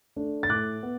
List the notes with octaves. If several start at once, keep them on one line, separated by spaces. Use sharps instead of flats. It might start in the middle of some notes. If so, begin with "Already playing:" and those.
A3 D4
A6
A2 D6 F#6
B3